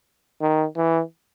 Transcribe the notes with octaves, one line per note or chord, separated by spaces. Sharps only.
D#3
E3